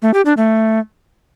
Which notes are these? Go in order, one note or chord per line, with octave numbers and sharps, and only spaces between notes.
A3
G4
D4
A3